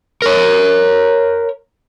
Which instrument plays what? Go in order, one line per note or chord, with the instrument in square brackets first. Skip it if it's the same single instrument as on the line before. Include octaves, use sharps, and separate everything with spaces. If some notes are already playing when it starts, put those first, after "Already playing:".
[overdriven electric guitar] A#4 C#5